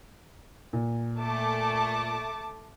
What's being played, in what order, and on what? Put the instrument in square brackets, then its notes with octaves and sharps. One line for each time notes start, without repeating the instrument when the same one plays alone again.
[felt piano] A#2
[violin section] A3 A5 D6